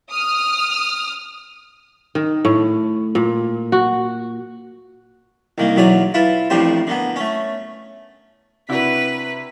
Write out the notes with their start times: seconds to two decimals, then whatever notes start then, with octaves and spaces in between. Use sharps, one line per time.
0.11 D#6 F6
2.15 D#3
2.45 A2
3.15 A#2
3.72 F#4
5.58 C2 D#3 A#3
5.76 B1 E2 F#3 D5 G#5 A#5
6.14 E4 F4 B4 A5
6.50 A1 F2 A2 D4 G4 C5
6.87 D3 A#3 B3
7.16 A3 C#4
8.69 C3 D4 E4 F#4 B4 B6